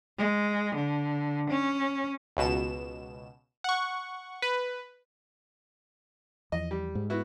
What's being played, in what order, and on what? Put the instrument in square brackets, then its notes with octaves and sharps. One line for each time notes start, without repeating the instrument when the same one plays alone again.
[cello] G#3
D3
C#4
[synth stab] C#2 B2 E7
F#5 C#6
B4
[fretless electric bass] E2 F3 [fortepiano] D#5
[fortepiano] G3
[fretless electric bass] G#2
[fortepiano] B3 E4 F#4